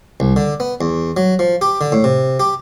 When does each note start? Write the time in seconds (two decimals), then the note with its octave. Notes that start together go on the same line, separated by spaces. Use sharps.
0.20 C2
0.36 D3
0.60 B3
0.81 E2
1.17 F#3
1.39 F3
1.61 G4
1.81 D3
1.92 A2
2.04 C3
2.40 G4